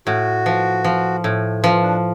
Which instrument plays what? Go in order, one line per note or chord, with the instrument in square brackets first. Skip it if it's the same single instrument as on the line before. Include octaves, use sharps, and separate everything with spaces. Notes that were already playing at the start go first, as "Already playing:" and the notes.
[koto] A2 [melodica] F#4
[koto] F3
F3
A2
[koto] F3 [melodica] F4
[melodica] D4